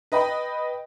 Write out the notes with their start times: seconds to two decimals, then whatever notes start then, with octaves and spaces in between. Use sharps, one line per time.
0.12 B4 D#5 G5 B5